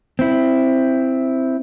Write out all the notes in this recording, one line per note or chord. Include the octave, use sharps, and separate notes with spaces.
C4 E4